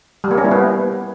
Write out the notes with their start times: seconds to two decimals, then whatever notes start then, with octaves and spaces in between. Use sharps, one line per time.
0.24 G3
0.31 A#3
0.38 C#4
0.45 E4
0.51 B3